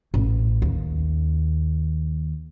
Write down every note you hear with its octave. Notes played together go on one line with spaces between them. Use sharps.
A1
D#2